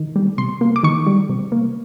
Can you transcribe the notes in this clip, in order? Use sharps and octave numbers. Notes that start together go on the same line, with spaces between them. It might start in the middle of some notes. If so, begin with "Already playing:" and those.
Already playing: D#3
G3
C3 C6
A#3
D6
D#3 C#6
G3
C3
A#3